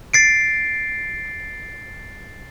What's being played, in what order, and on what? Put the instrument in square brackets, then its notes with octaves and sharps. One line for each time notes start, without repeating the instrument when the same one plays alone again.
[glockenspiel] A6 C7 D7